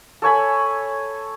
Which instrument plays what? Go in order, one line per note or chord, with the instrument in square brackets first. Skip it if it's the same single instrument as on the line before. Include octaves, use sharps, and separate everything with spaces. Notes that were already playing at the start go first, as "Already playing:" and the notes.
[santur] A4 C#5 G#5 B5